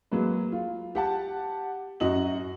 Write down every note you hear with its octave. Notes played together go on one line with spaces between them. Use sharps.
F#3 G#3 A#3 B4
F4
G4 F#5 A5
F#2 F#4 D#5 F#7